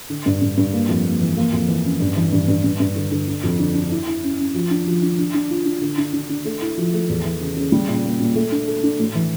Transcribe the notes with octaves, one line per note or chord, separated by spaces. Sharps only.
D3
G2
G2
G2
A#3
F2
A#3
E3
A#3
F2
E3
C#4
G2
E3
G2
G2
G2
G2
D3
D3
D4
F2
D3
D4
E4
E4
C#4
C#4
F3
D4
F3
D4
D4
D4
F4
D4
D3
D4
D4
D4
A3
E4
F3
A3
E2
E3
C#3
C#3
G3
A#2
A#3
A#2
A3
D4
A4
D4
A2
E3